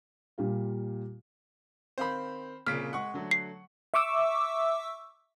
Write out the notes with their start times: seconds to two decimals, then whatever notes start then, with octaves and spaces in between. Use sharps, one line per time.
0.38 A#2 G3 F4
1.98 D#3 C4 C5 F5 B5
2.67 C2 A#2 C#3 F6 B6 D7
2.93 G#3 G#4 F#5 C#6
3.14 D3 F#3 A3
3.31 C7
3.94 E5 C#6 D6 E6